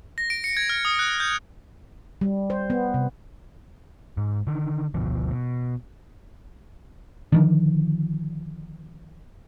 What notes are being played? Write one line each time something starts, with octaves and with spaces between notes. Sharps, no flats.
A#6
D7
C#7
G#6
F6
D#6
F#6
G6
G3
C5
B3
C3
G#2
D3 D#3
G#1 D2 B2 F3
B2
D3 D#3 F3